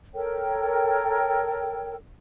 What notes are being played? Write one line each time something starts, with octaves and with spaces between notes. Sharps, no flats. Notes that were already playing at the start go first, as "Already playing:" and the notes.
A4 A#4 C#5 G5